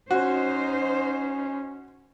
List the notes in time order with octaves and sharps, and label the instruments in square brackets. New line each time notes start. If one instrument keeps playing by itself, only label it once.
[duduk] C#4 [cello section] D#4 C5 [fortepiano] F#4